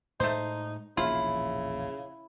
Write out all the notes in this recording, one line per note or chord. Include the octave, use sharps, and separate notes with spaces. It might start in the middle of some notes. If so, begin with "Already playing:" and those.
A2 G#3 A3 D#4 C5
E1 A#1 C#3 A#3 E4 F4